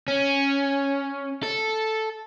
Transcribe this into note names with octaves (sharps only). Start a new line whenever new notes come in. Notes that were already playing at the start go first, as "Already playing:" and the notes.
C#4
A4